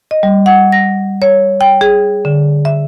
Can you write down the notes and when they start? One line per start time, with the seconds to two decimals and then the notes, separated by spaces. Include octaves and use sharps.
0.11 D#5
0.23 G3
0.46 F#5
0.72 A#6
1.22 C#5
1.61 G5
1.81 G#4
2.25 D3
2.65 E5